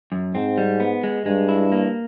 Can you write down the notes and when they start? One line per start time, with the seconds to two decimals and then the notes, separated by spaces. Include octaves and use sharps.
0.12 F#2
0.35 G#2 C4
0.58 G3
0.80 B3
1.03 G#3
1.26 G2 G#3
1.49 E4
1.72 A#3